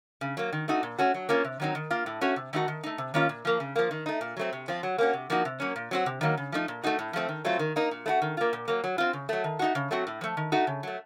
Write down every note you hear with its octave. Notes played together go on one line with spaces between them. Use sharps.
C#3
F#3 A#3
D#3
A3 D#4 F#4
A#2
A3 C#4 F#4
F#3
A#3 C#4 F4
C3
D#3 F#3 C4 D#4
D#3
A#3 F4
A2
A3 C#4 F#4
C3
D#3 A3 D#4 F#4
D#3
A3 D#4
C3
D#3 A#3 C#4 F4
A#2
F3 A#3
C#3
F3 A#3
D#3
A3 D#4
A#2
F#3 A3 C4
C3
F3 C4 F4
F#3
A#3 C#4 F#4
C3
F3 A#3 D#4 F#4
C3
F#3 A#3 C#4
A#2
F#3 C4 F#4
C3
D#3 F#3 A#3
C#3
F3 A3 D#4
A#2
A3 D#4 F#4
A2
F3 A3 C4
D#3
F#3 A3 C4 F4
D#3
A#3 D#4
A#2
A3 D#4 F#4
D#3
A#3 F4
A#2
F#3 A#3
F#3
C4 F4
C#3
F#3 A3
D#3
A3 D#4 F#4
C#3
F#3 A3 C4 F#4
A2
F3 A3
D#3
A3 D#4 F#4
C#3
F#3 A3